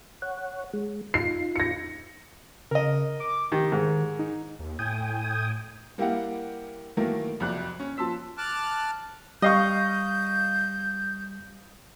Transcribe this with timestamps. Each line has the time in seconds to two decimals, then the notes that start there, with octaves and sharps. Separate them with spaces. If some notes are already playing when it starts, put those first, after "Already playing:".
0.22 C#5 F#5
0.74 G#3
1.14 D#4 F4 C7
1.56 A#6 C#7
2.71 C#3 A#4 D#5
3.20 D6
3.52 D#3 G4
3.72 G#2 D#3
4.19 D#4
4.59 D#2
4.79 A2 G5 G#5 D#6
5.98 G3 A#3 E4 G4 F5 F#5
6.97 D#3 E3 F#3 A3 A#3 A#4
7.40 C2 F2 F#3 D5 F#6
7.80 C#4
7.97 F3 A5 C6 E6 B6
8.38 A5 D6 F6 F#6
9.42 G3 D#5 F5 C#6 G6